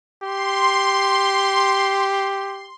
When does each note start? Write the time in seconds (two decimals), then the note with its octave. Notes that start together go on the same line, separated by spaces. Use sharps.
0.22 G4 C6